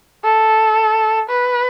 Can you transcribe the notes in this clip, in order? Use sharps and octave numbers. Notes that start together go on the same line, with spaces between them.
A4
B4